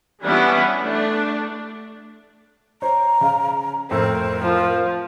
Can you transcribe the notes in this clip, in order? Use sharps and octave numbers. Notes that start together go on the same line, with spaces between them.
E3 G3 B3 C#4 D4 E4
A3 D4
C5 C#5 A#5
C#3 F5
F2 A2 C4 A#4
F3